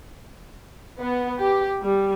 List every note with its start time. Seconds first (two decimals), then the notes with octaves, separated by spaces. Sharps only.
1.00 B3
1.40 G4
1.82 G3